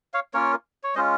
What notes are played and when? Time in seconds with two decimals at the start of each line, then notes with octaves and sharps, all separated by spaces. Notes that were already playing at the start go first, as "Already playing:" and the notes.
0.14 C#5 F5
0.34 A#3 C#4 F4 A#4 C#5
0.84 C#5
0.95 G#3 C#4 F4 C5 D#5